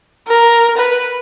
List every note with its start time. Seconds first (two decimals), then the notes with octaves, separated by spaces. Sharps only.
0.28 A#4
0.77 B4